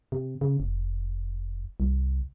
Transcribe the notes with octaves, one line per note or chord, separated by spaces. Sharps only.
C3
C#3
F1
C2